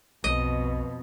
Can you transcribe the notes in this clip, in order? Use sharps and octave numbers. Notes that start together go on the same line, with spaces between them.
B1 F2 B2 D#5